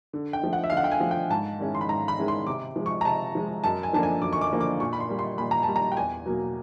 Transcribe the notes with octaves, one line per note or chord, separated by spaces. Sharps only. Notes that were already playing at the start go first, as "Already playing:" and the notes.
D3
G5
F3 A3
F#5
E5
D3 F5
F#5
G5
G#5
F3 A3
G5
G#2 A5
D#3 G#3 C#4 E4
C6
B5
G#2 A#5
B5
D#3 G#3 C#4 E4
C6
C3 D6
F3 G#3
C#6
A#5
C3 A5
F3 G#3
F#2 A5
G#5
D3 F3 A#3 D4 A5
G#5
F#2 D6
C#6
D6
D3 F3 A#3 D4
D6
A#2 C#6
B5
C6
G3 A#3
C6
A#2 B5
A#5
A5
G3 A#3
A#5
G5
E2 G#5
B2 F#3 A#3